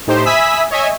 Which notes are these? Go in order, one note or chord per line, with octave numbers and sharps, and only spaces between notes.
A2 D#4 G4 C5
E5 G#5 B5 D#6 E6 B6
C#5 D#5 E5 G#5